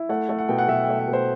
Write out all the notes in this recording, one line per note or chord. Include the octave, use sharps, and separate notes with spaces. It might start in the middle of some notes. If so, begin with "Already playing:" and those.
Already playing: E4
A3 F#5
A3
F#5
B2 G5
F#5
B2 E5
G5
A3
E5
B2
C5